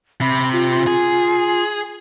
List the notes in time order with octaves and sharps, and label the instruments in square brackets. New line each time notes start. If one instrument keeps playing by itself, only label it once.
[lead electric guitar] C3 [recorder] B5
[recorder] F4
[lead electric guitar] G#4